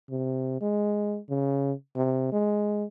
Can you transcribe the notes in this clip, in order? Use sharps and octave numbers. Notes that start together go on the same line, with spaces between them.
C3
G#3
C#3
C3
G#3